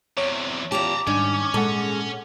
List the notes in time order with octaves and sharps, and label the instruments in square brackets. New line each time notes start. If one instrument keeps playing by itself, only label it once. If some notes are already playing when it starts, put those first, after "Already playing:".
[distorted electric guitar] E2 C3 [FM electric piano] C#5
[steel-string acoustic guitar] E2 F4 G4 [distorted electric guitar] A5 A#5 [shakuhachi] D6
[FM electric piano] G#2 G3 D4 [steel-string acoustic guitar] D#3 [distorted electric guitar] C#4 C#5
[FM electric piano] A#2 F#5 [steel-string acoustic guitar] G#3 A4